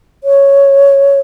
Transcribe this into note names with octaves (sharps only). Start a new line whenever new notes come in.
C#5